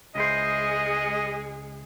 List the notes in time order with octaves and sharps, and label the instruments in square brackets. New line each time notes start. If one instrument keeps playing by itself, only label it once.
[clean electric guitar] C#2 E4 C5 [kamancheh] G#3 G#4 [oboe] D#5